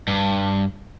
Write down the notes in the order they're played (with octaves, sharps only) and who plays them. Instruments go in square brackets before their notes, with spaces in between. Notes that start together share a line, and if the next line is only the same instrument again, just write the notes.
[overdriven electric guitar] G2